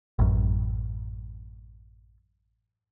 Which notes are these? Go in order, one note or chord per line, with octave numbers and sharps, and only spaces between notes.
A1 F#2